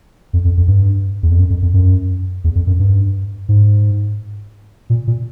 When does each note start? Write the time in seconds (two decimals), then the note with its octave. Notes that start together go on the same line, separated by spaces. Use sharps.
0.33 F2
0.45 F2
0.57 F2
0.68 G2
1.23 E2
1.31 F2
1.39 F#2
1.50 F2
1.62 F2
1.74 F#2
2.44 E2
2.55 F2
2.67 F#2
2.79 G2
3.49 G#2
4.90 A#2
5.07 A#2